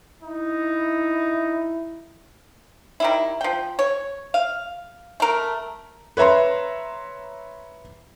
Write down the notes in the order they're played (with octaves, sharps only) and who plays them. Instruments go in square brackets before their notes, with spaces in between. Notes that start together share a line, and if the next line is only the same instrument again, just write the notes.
[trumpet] D#4 [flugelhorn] E4
[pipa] D#3 G3 E4
F3 G5
C#5
F5
A3 A#4
[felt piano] B4 C#5 E5 A#5 C6